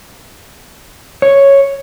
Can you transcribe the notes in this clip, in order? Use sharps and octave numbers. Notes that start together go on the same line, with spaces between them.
C#5